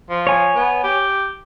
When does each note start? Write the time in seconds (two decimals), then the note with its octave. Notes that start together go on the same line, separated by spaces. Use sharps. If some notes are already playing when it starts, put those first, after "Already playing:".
0.10 F3
0.27 C#5 G#5
0.55 B3
0.83 G4